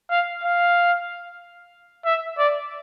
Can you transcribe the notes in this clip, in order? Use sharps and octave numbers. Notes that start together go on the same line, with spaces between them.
F5
F5
E5
D5